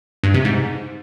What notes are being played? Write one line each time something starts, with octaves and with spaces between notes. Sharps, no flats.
G2
C3
G#2